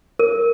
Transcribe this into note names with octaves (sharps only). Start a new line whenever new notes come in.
A#4